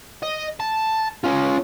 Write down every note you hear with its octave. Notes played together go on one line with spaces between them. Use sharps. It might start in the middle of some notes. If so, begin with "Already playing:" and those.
D#5
A5
C#4 F4